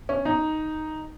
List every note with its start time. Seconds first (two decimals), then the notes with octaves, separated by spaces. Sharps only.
0.09 C#4
0.25 D#4